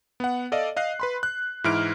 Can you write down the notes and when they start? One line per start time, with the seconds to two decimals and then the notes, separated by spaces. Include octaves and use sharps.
0.20 B3 F#5
0.52 A4 D5 D#5 F5
0.76 D#5 F5 F#6 C7
1.00 B4 B5 C6
1.23 F#6
1.64 G#2 E3 E4 F6 D7